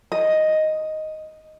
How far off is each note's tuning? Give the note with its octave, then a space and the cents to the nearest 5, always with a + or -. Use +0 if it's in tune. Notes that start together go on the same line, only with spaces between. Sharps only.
D#5 +0